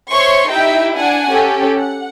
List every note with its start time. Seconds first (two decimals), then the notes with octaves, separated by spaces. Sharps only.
0.11 C5 C#5 E5 C6 C#6
0.50 D#4 E4 G4 E5 G5
0.97 D4 F#5 G#5
1.31 C#4 G4 A4
1.77 F#5